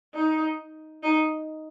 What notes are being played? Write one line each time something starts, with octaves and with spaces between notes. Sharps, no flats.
D#4
D#4